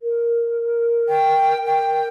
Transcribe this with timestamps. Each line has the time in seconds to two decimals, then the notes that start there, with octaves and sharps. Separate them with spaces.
0.01 A#4
1.09 G5
1.66 G5